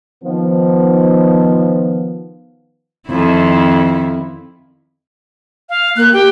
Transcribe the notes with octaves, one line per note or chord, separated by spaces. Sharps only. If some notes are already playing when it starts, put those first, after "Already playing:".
D#3 F3 B3
F2 D#3 E4
F5
A#3 F#6
G4 G5